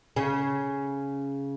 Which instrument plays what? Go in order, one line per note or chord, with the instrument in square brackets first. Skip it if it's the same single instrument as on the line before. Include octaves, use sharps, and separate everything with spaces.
[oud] C#3